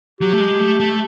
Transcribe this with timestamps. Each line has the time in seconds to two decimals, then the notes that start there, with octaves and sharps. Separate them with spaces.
0.20 F#3 G4
0.33 A3
0.40 G#3
0.60 A3
0.80 A3